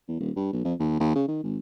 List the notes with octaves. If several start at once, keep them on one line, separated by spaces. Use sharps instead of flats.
E2
D#1
G2
B1
F2
D#2
D#2
C#3
D#3
G#1